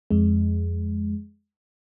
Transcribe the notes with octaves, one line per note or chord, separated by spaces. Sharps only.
F2 G#3